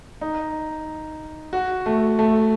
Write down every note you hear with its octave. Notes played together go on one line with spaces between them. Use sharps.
D#4
F#4
A3
A3